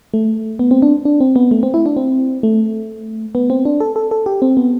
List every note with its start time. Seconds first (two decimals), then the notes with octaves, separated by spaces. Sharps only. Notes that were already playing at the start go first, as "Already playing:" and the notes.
0.13 A3
0.59 B3
0.71 C4
0.82 D4
1.05 D4
1.20 C4
1.36 B3
1.51 A3
1.63 C4
1.74 E4
1.86 D4
1.97 C4
2.43 A3
3.35 B3
3.50 C4
3.65 D4
3.80 A4
3.96 A4
4.11 A4
4.26 G4
4.42 C4
4.57 B3